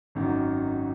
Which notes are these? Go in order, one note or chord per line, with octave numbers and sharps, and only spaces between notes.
G#1 F#2 D#3 F#3